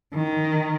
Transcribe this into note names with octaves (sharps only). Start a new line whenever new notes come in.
D#3